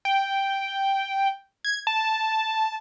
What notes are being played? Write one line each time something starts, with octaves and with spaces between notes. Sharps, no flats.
G5
G#6
A5